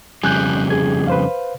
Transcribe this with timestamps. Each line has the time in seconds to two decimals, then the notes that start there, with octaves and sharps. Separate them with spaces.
0.23 F2 C#3 G3 G#5 F#6 G6
0.70 G#4 G#6
1.07 B4 C5 F5